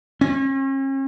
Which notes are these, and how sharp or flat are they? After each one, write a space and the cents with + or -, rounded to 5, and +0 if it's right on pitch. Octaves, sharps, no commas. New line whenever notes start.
C#4 -45